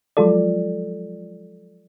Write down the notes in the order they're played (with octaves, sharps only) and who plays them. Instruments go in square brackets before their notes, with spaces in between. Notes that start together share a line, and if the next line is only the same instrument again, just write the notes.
[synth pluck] F3 F#3 G#3 F4 A4 D5